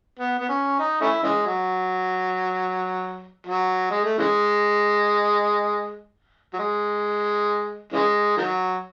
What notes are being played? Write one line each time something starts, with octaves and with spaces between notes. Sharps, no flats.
B3
B3
C#4
D#4
A3 C#4 E4
C#3 E3 G#3
F#3
F#3
G#3
A3
C#3 E3 G#3
F#3
G#3
C#3 E3 G#3
D#3 F#3